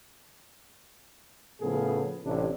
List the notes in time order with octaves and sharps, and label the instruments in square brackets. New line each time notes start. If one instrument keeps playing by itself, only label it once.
[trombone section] A2 C#3 F3 B3 G#4 A4
A1 C3 D4